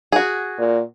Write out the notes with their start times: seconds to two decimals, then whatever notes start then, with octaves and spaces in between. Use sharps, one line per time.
0.12 F#4 G#4
0.58 A#2